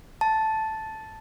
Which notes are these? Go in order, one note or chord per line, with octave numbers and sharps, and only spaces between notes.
A5